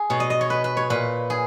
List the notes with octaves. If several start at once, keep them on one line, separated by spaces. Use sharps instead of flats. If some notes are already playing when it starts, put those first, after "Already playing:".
Already playing: G#4
B2 C#5
D#5
D#5
C#5
B4
B4
C#5
A#2 B4
G#4